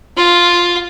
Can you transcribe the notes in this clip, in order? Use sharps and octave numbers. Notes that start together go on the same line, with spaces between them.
F4